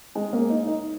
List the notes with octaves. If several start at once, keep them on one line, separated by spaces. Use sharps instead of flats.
G#3
A#3
D#4
D#4